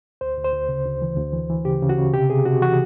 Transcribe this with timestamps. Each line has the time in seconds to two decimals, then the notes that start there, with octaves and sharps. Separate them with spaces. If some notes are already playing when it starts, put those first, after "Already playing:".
0.21 D2 C5
0.38 D2
0.44 C5
0.53 D2
0.69 C#3
0.85 D2
1.02 E3
1.17 D2
1.33 E3
1.50 E3
1.65 C#3 G4
1.82 C#3
1.89 F#4
1.98 C#3
2.13 C3 G4
2.29 C3 G#4
2.45 C3 F#4
2.61 E3 F#4